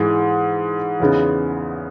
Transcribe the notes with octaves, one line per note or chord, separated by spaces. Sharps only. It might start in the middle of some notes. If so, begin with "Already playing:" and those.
Already playing: G#2 E3 G#3
E2 C#3 G#3 B3 D#4